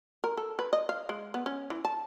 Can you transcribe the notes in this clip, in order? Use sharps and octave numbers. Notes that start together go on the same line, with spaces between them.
A#4
A4
B4
D#5
F5
G#3
B3
C#4
E3
A5